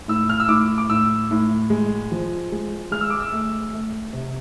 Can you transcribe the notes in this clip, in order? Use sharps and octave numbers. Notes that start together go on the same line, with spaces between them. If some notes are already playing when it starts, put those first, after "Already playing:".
A2 E6
F6
E6
A2 D6
D6
A2 E6
A2
G#3
F3
G#3
G#3 F6
E6
D6
E6
A3
A3
C3